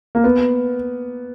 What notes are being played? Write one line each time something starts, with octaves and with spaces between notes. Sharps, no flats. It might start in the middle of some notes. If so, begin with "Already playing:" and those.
A#3
B3